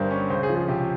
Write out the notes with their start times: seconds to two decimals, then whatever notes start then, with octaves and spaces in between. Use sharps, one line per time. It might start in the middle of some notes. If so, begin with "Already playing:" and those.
Already playing: G1 G2 G3 A#4 C5
0.10 C#4
0.30 C#2 C5
0.43 G#4
0.49 F3
0.56 G#4
0.68 C3 G4